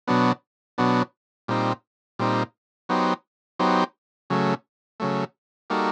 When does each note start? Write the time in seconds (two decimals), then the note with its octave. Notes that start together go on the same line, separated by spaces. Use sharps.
0.07 B2 F#3 B3 D4
0.78 B2 F#3 B3 D4
1.48 A#2 G3 C4 D#4
2.19 A#2 G3 C4 D#4
2.89 F#3 B3 D#4 G4 C5
3.59 F#3 B3 D#4 G4 C5
4.30 C#3 F#3 A3
5.00 C#3 F#3 A3
5.70 G3 A#3 D#4 F#4 A4